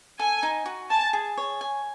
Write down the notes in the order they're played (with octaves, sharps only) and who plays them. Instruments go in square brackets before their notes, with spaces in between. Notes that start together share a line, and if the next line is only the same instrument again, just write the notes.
[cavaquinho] A4 [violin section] G#5
[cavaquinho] D#4
F#4
[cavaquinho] G#5 [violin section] A5
[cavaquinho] G#4
C#5
G#5